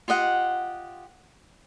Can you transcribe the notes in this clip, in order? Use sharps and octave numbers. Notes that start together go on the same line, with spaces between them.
F4 G4 D#5 F#5